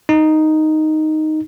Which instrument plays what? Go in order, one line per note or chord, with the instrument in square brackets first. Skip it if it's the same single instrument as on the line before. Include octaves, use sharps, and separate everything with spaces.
[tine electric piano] D#4